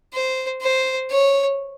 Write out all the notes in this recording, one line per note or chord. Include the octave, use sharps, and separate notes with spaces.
C5
C5
C#5